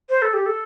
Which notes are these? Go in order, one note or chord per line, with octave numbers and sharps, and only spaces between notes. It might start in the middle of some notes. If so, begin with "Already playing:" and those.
C5
A4
G4
A4